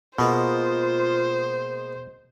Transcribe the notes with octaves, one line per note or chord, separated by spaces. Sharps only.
B2 G#3 A#3 B3 F4 C5